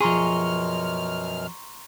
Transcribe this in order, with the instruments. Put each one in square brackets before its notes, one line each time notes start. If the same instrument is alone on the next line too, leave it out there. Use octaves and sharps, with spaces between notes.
[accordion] F#2 B2 F6 [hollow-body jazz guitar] F3 G#4 [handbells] A#5 C6 C#6